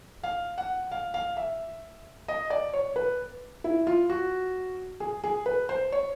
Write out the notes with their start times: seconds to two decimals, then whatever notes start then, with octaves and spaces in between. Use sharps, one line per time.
0.23 F5
0.58 F#5
0.91 F5
1.14 F5
1.37 E5
2.28 D#5
2.50 D5
2.74 C#5
2.96 B4
3.64 E4
3.87 F4
4.10 F#4
5.00 G#4
5.24 G#4
5.46 B4
5.69 C5
5.92 C#5